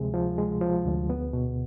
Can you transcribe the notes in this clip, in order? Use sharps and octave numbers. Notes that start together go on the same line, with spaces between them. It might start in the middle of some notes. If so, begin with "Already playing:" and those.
Already playing: D2 C3 F3 G#3 G#4
F3
G#3
F3
D2
B3
B2